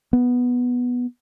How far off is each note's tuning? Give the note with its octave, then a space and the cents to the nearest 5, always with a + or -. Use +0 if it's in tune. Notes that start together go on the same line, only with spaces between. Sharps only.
B3 -5